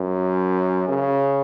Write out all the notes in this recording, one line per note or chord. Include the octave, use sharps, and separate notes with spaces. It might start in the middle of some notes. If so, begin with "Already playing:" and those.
Already playing: F#2
C#3